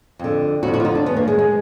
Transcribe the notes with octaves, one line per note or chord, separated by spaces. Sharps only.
F2 D3
F2 D3 F#4
F#4
F4
D#4
D4
F#2 D#3 B3
A#3
G#3
G#3